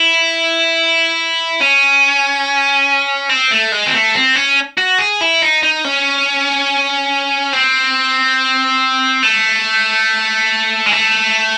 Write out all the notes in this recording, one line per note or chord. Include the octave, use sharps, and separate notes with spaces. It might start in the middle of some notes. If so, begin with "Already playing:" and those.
Already playing: E4
C#4
C4
A3
G#3
C4
A3
C4
C#4
F#4
G#4
E4
D#4
D#4
C#4
C4
A3
G#3
A3